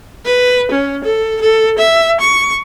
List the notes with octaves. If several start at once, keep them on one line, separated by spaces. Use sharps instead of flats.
B4
C#4
A4
A4
E5
C#6